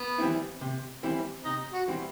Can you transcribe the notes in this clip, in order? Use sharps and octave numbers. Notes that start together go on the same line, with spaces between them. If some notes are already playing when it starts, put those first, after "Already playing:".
Already playing: B3
E3 G3 C4 E4
C3
E3 G3 C4 E4
C3 D#4
F#4
E3 G3 C4 E4